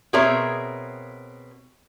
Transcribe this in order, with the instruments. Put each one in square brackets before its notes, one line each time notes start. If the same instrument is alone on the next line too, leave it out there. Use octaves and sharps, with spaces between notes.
[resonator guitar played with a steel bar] B2 C4 G#4 A#4 C#5 E5